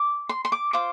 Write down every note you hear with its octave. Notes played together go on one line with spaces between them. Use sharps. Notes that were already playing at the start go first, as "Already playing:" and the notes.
Already playing: D6
C6
C6
D6
F4 C5 D6